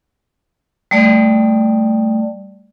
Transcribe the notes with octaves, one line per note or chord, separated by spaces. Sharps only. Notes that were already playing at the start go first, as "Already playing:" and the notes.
G3 A3 D5